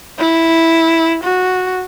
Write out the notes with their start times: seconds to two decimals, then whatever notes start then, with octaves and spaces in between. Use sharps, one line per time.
0.19 E4
1.24 F#4